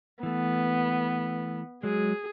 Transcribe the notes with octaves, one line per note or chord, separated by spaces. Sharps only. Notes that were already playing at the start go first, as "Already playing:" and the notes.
E3 A3 B3
F#3 G#3 G#4